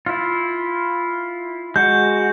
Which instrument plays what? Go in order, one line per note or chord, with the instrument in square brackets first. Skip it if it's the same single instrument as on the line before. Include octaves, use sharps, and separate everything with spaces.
[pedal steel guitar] E4 F4
[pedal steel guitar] G#3 F#4 [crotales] G6